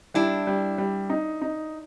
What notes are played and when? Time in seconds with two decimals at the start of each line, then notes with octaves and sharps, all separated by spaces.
0.14 G3 D4 E4
0.47 G3
0.78 G3
1.10 D#4
1.42 D#4